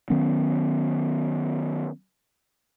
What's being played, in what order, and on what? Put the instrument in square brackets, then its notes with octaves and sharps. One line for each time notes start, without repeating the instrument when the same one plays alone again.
[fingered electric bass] D#3 F#3 B3 C#4